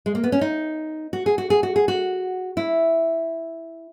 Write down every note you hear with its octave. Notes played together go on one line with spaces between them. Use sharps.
G#3
A#3
B3
C#4
D#4
F#4
G#4
F#4
G#4
F#4
G#4
F#4
E4